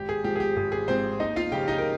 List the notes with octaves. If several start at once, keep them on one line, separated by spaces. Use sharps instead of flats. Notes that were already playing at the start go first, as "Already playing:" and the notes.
Already playing: G#1 G4
G#4
G#2 F3 G4
G#4
G4
G#1 G#4
G#4
G#2 F3 C4 C5
D#2 D#4 D#5
F4 F5
C#3 F3 G4 G5
D#4 D#5
A#4